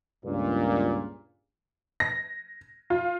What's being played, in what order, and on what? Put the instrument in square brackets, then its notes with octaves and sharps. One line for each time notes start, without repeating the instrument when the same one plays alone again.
[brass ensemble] C#2 G2 A#2
[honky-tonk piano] A#6
F4